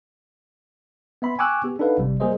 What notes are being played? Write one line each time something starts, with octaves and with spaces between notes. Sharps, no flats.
B3 E5 B5 C6
G5 G#5 C#6 D6 E6 F#6
B3 G4 G#4
D4 D#4 A4 B4 F5 F#5
G#1 C3 G3
G3 A#3 G#4 A#4 C5 D#5